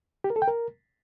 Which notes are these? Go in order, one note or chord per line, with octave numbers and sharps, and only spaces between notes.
G4
A#4
A4
G5
A#4